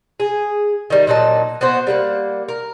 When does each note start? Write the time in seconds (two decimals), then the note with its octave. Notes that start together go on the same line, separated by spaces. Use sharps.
0.20 G#4
0.90 D#3 G3
1.07 A#2 F#3 D#4 A5
1.61 B3 F#4 C5
1.87 G3 A#3 F#5
2.48 A#4